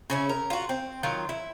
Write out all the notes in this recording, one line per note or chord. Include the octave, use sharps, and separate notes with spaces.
C#3 C#4 E4
A#4
F4 F#4
C4
D#3 F#3 F4
E4